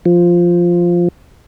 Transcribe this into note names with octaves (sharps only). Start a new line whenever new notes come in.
F3